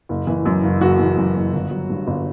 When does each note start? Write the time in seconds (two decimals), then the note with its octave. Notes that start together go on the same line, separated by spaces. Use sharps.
0.09 F#1
0.27 E3
0.45 F#2
0.63 F#1
0.81 F#1 F#4
0.99 E3
1.17 F#2
1.35 F#1
1.53 G1
1.71 F#3
1.89 G2
2.07 G1